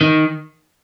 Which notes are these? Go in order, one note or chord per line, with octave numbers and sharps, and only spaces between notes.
D#3